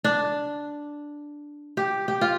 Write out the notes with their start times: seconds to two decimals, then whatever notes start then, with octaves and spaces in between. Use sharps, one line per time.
0.04 D4
1.77 G4
2.08 G4
2.21 F4